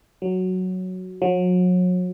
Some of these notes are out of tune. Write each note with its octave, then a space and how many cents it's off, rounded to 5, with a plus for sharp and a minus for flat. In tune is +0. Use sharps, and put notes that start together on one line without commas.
F#3 +0
F#3 -35